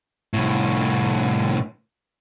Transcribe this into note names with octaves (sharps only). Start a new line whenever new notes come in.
C2 A2